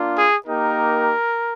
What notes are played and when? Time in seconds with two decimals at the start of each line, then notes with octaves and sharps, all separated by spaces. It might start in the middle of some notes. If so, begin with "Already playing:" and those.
Already playing: A#3 D4 F4
0.18 G#4
0.46 A#3 D#4 G4 A#4